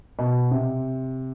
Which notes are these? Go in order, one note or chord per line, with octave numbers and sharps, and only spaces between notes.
B2
C3